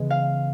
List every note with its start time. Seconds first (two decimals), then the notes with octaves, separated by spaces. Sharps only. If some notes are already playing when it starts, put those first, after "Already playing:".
Already playing: C#3 E3 G#3 B3
0.10 F5